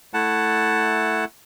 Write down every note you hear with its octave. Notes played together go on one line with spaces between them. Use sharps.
A3 E4 F#5 A5